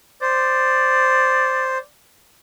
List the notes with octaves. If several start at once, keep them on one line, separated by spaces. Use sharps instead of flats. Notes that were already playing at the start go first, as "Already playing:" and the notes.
C5 D5